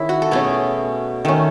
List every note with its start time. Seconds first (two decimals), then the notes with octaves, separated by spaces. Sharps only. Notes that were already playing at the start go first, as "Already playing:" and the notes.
Already playing: D#3 C#4 E4 G#4
0.09 F#4
0.22 A4
0.31 B2 A3 C#4 G#4
1.25 D#3 A3 C#4